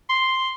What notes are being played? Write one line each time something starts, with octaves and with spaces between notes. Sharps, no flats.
C6